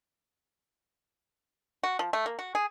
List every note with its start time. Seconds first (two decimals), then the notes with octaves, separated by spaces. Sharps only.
1.83 F#4
1.99 F3
2.13 A3
2.26 A#3
2.39 F#4
2.55 G#4